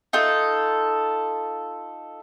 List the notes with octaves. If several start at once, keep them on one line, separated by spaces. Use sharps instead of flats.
D#4 F4 A4